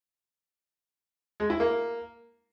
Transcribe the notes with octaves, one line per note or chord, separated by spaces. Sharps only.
G#3
E4
A#3